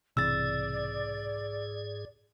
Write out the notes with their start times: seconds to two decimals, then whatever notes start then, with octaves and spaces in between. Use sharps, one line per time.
0.17 B1 G#2 C3 E3 G#4 D5 E6 A6